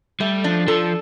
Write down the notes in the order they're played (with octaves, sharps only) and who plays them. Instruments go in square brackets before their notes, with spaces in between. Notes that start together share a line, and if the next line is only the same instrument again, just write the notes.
[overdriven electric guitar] G3 [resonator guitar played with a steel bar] A3
[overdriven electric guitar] F3 [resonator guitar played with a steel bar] D4
[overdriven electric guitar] F3 [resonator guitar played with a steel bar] A4